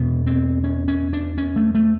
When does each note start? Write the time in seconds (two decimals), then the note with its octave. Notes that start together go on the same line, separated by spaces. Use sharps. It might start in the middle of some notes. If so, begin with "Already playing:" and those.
Already playing: E2 B2 B3
0.27 C4
0.64 C#4
0.88 C#4
1.13 D4
1.38 C#4
1.56 A3
1.75 A3